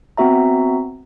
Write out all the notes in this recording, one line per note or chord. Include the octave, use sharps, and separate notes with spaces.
B3 C4 F#4 E5 A#5